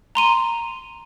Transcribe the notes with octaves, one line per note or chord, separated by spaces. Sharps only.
A#5 C6 D#7